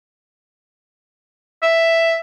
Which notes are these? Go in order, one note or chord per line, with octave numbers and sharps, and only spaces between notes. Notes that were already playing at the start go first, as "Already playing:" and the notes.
E5